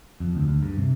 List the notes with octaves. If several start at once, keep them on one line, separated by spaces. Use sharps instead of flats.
F2
D2
D2
G2
C3